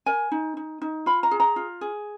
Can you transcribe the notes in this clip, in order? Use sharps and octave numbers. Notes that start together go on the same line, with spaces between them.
A#4 G#5
D#4
D#4
D#4
F4 B5
A#5
G#4
A#5
F4
G#4